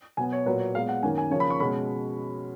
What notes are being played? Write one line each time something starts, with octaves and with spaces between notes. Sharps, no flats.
B2 F#3 B3 G#5
C#5
A#2 F#3 A#3 B4
C#5
A#2 G#3 B3 F5
F#5
F#2 D#3 A#3 C#4 G#5
G#5
C#3 F3 A#3 C#5
B5
C#6
B2 G#3 C#4 B5